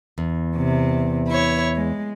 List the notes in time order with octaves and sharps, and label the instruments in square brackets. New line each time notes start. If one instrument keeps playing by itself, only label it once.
[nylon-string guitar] E2
[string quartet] C3
E4 C#5
G#3